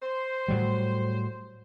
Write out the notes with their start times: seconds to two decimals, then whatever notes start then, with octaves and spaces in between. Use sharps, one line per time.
0.01 C5
0.48 A2 F#3 G3